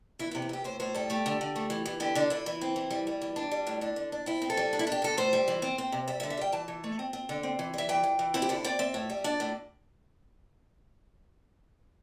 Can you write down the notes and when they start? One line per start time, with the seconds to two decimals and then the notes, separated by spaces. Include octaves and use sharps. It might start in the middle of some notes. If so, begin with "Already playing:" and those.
0.19 E3 E4
0.31 E4
0.35 C3
0.42 E4
0.49 C3 G4
0.64 A2 C5
0.80 A2 C5
0.94 G3 A4
1.10 A3 G4
1.26 D3
1.41 D3
1.56 A3
1.70 E3
1.86 E3
2.00 D3 G4
2.15 D3 D4
2.30 D3 E4
2.46 E3
2.61 C4
2.76 E3
2.91 G3
3.07 G3
3.22 E3
3.36 G3 D4
3.51 G3
3.67 A2
3.81 D3 D4
3.96 D3
4.12 D4
4.26 C4 E4
4.42 C4
4.50 A4
4.57 G3
4.73 D4
4.79 E4
4.87 D4 G4
5.02 D3 A4
5.17 A2 C5
5.33 G3
5.48 E3
5.62 C4
5.78 C4
5.92 C3
6.08 G3 E5
6.20 E5
6.23 D3
6.30 E5
6.37 G3 G5
6.52 E3 A5
6.68 E3
6.84 A3
6.99 C4
7.13 C4
7.29 D3
7.43 C4
7.59 E3
7.74 G3 E5
7.89 E3 G5
8.03 E3
8.19 E3
8.34 C4 E4
8.42 G4
8.49 D3 E4
8.64 C4 D5
8.79 C4 E5
8.94 A2
9.10 G3
9.24 D4 D5
9.40 A2